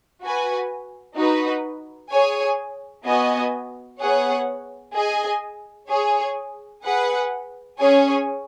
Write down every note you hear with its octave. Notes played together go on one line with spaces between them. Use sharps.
F#4 B4 G#5
D#4 F#4 B4
G#4 C#5 G#5
B3 F#4 D#5 G#5
B3 G#4 C#5 F#5
G#4 D#5 G#5
G#4 C#5 G#5
G#4 B4 F#5
C#4 G#4 C#5 G#5